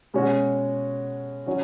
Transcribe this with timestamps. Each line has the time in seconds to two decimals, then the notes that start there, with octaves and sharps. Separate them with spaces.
0.14 B2 G#3 C#4 F#4
1.46 F#3 C#4 F#4